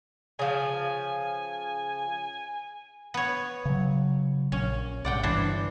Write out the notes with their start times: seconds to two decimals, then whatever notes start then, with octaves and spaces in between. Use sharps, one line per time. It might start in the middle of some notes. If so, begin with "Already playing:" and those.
0.39 C#3 F3 G#5
3.14 B3 C#5
3.65 C#3 F#3
4.52 A#1 C#4
5.05 C2 G#2 D5 F#5 G5
5.23 G1 E3 D4 C5